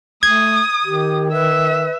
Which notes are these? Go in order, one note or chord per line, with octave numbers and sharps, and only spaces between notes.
A3 D#6 G#6
D#3 G4
B4 E5